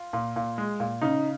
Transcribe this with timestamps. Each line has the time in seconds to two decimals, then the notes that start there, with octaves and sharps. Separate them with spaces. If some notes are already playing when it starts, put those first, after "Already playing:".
Already playing: F4
0.13 A#2
0.36 A#2
0.58 G#3
0.80 A#2
1.01 C#3 D#4